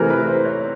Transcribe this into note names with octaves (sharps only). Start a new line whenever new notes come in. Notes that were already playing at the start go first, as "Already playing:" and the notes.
Already playing: C3 E3 A3 C4 A#4
B4
C5
C#5